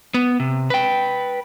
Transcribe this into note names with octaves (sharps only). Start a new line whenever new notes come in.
B3
C3
B4 G5